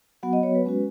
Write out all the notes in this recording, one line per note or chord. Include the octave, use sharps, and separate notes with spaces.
F#3 B3 F#4 F#5
D#5
C#5
B4
G#3 C#4 F#4